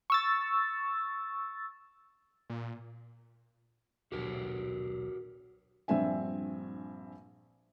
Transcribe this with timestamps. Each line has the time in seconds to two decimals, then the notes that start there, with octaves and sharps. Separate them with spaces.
0.10 C#6 E6 A6
2.50 A#2
4.12 D#1 B1 F#4 G4 A#4
5.88 A#1 G2 C4 E5 G#5